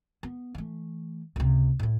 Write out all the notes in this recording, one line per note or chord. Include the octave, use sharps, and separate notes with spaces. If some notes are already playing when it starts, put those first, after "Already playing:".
B3
E3 A3
C#2 C3
A2 E4